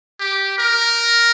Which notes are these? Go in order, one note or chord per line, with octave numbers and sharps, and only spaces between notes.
G4
A#4